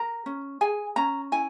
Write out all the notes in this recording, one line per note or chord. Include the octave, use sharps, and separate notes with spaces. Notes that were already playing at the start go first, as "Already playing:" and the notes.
Already playing: A#4 A#5
C#4
G#4 G#5
C#4 A#5
E4 G#5